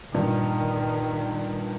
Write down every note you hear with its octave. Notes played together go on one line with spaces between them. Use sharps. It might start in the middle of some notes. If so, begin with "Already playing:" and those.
G2 A#2 D#3